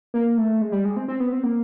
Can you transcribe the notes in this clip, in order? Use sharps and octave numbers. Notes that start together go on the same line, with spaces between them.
A#3
A3
G#3
G3
G#3
C4
C4
B3
C4
A#3